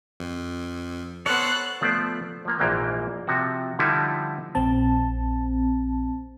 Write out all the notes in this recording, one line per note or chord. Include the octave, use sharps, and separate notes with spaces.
F2
B3 A4 C5 C#5 F#6
F3 A3 B3 C5 D5
F3 A#3
A#1 G#2 E3 A#3 G5
C3 F3 F#4
D3 F3 G3 D#4 E4
A#1 C4 A5